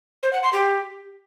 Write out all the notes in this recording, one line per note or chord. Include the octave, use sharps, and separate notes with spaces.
C5
F#5
C6
G4